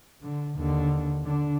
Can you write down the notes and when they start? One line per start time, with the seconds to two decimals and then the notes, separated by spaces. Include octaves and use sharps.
0.22 D3
0.57 D#2 D3
1.24 D3 D4